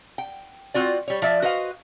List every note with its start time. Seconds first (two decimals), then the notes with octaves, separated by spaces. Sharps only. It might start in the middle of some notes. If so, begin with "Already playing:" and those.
0.18 G5
0.74 C4 F4 F#4 D5
1.08 G3 C#5
1.22 F3 D5 E5
1.42 F#4 B4 C5 D#5 F5